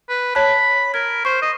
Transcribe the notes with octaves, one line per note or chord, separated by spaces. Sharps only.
B4
C#5 A5 B5 F#6
A#4 G#6
C5 C#6
D#5